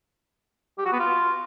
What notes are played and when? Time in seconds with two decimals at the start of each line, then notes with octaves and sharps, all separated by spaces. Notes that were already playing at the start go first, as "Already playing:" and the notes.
0.78 G4
0.85 F#4
0.92 B3
1.00 F4